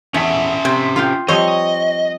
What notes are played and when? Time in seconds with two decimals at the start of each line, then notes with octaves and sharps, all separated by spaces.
0.14 E2 C#4 E5 A5
0.65 C3
0.96 F4 F5 G5
1.28 F3 G3 C4 C#5 D#5